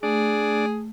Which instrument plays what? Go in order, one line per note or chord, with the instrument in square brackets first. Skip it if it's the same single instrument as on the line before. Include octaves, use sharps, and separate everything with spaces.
[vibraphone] A3 [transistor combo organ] D4 D5 [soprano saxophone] G#4